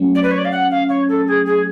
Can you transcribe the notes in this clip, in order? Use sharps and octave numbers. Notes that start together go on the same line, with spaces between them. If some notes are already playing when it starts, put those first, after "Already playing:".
Already playing: F#3 A3 C#4
D5
B4
C#5
D5
F5
F#5
F5
C#5
A4
G#4
G#4